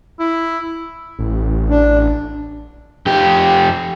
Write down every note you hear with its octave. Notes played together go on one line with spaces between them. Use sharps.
E4
A1
D4
F2 G4